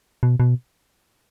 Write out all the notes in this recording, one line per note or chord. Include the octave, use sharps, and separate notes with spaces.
B2
B2